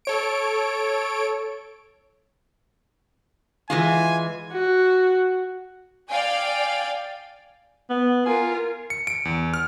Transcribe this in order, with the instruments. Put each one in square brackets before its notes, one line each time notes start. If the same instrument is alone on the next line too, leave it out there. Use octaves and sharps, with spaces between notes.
[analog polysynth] A4 C#5 D7
[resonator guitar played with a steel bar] E3 G#3 F4 [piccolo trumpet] G#5
[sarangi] F#4
[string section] D5 F5 G5 G#5
[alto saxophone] B3
[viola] F4 A#4 [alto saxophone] G#5
[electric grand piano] C#7
D7
E2
F6